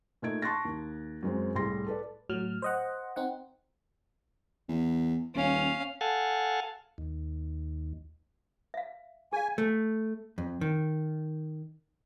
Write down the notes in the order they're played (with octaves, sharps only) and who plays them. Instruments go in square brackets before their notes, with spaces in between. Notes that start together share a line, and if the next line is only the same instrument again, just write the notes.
[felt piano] A#2 A3 D#4 G#6 D7
A5 C6 C#6 F#6 A6 A#6
D#2
F#2 G#3 C4
C2 A2 G3 G#4 C6 A#6
A4 B4 D5
[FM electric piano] A2 F#3 F6
C5 D#5 F#5
C4 D#4 F#5
[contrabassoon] E2
[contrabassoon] D#1 [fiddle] C#4 F5
[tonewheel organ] A4 F5 F#5 G#5 A5
D#2
[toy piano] E5 F5
[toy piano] G#4 F5 [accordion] G#5
[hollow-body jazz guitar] A3
F2
D#3